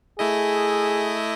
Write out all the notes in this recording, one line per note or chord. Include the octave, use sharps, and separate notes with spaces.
A3 E4 G#4 D#5